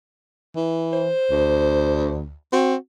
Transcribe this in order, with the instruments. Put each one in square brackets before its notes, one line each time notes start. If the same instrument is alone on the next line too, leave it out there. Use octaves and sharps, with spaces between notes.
[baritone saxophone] E3
[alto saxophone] C5
[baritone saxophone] D2
[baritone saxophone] C4 [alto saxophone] F#4